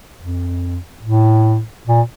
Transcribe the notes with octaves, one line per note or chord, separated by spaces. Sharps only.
F2
A2
A#2